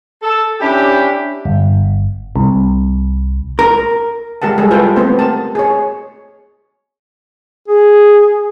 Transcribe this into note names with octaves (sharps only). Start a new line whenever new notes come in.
A4
C#4 D4 E4 G4
G1
C2
A#4
G#3 G4 A#4 F#5 A5
G3 G#3 G#4 A4
F4 A4 B4 F5 G5
A3 B3 C4 G4 C5
A#4 A5
G#4 C#5
G#4